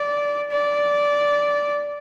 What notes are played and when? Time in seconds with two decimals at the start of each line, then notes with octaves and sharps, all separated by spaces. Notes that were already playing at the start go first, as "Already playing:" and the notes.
Already playing: D5
0.51 D5